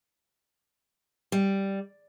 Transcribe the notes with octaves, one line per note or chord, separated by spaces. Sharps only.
G3